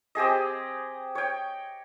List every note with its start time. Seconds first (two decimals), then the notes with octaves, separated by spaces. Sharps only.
0.15 C4 G4 G#4 D#5
1.15 C#5 G5